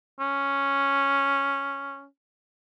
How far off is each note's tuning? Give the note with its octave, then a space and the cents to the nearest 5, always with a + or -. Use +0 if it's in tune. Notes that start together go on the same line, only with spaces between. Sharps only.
C#4 +0